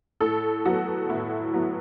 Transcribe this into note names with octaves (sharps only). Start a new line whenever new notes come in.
A2 A4
F#3 B3 F#4
A2 E4
F#3 B3